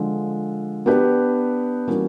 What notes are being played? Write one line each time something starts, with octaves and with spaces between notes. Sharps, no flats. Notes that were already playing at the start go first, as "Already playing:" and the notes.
Already playing: D3 F3 G#3
B3 D4 G4 B4
E3 G3 A#3 C#4 F#4